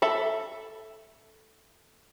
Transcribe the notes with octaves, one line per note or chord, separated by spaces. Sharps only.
A4 E5 B5